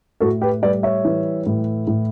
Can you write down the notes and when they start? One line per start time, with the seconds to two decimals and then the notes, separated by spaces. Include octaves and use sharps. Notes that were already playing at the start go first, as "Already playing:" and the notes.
0.20 A2 F#4 A4
0.41 G4 B4
0.62 G3 B4 D5
0.83 C#5 E5
1.05 E3
1.46 A2
1.87 A2